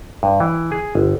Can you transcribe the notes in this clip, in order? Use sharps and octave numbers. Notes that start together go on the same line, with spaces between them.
G2
E3
G#4
G1